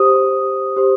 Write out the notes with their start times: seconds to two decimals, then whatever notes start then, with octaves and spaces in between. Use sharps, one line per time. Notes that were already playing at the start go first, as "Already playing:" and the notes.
Already playing: G4 C5 D#6
0.76 G4 C5